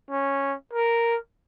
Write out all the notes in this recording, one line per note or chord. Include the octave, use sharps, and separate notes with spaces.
C#4
A#4